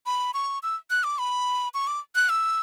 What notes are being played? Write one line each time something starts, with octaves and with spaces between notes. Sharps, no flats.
B5
C#6
E6
F#6
D6
B5
C#6
D6
F#6
E6